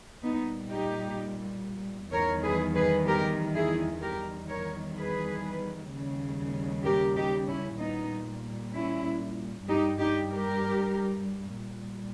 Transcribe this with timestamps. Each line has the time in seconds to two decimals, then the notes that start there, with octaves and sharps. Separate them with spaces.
0.23 A#2 G3 B3 D#4
0.71 D#4 G4
2.13 E2 D#3 G3 A#4 C#5
2.44 G#4 B4
2.75 G#4 B4
3.07 G4 A#4
3.54 E4 G#4
4.01 E2 D#3 G3 G4 A#4
4.48 A#4 C#5
4.96 G#4 B4
5.90 D#2 C#3 G3
6.85 G4 A#4
7.16 D#4 G4
7.48 C#4 E4
7.79 A#2 G3 B3 D#4
8.74 C#4 E4
9.68 G2 G3 D#4 G4
10.00 D#4 G4
10.31 G4 A#4
11.58 A#2 G3